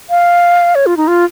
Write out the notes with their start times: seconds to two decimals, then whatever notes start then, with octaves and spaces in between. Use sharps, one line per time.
0.10 F5
0.75 C#5
0.86 F4
0.97 D#4
1.08 F4